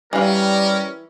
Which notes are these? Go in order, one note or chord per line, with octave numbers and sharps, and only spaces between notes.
E3 G3 C#4 A#4 F5